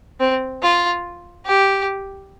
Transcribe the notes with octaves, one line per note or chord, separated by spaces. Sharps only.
C4
F4
G4